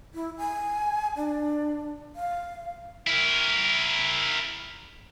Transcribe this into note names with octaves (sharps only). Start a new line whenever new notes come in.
E4
G#5
D4
F5
E4 A#4